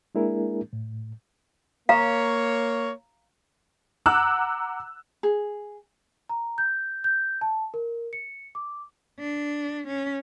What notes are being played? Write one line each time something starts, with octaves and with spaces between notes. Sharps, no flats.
G#3 A#3 D4 E4 G#4 A#4
A2
A#3 C#5 F5 A#5
F#5 A#5 D6 E6 F#6
G#4
A#5
G6
G6
A5
A#4
C#7
D6
D4
C#4